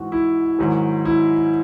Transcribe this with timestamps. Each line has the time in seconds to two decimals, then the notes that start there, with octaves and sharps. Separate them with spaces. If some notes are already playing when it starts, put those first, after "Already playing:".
Already playing: G#2 E3 F#4
0.12 E4
0.59 G#2 D#3 F#3
1.05 E4